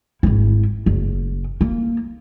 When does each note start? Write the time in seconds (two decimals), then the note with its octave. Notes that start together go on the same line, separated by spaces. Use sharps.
0.23 G#1 E4
0.86 F#1
1.61 A#3